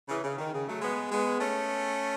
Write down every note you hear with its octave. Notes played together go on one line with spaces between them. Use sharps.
C#3 E3
C#3
D#3
C#3
F#3 A3
G#3 B3
G#3 B3
A3 C#4